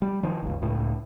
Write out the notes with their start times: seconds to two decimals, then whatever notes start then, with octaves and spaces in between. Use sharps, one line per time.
0.02 G3
0.23 D#3 F3
0.42 G1 C#2
0.62 C#2 A2